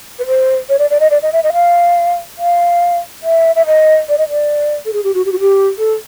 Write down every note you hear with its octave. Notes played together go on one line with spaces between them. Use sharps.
B4
C5
C#5
D5
D5
D#5
D5
D#5
E5
D#5
F5
F5
E5
E5
D#5
D5
D#5
D5
A4
G#4
G4
F#4
G4
F#4
G4
A4